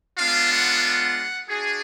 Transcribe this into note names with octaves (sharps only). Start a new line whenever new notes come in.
G#3 B3 D4 F4 F5
F#5
F#5
D4 F#4 G#4